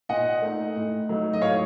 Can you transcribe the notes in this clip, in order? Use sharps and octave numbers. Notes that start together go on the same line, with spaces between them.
A#2 D#5 F#5
A3 D#4
A2
F#3 A3 D#4
D#5
A2 C#5 F5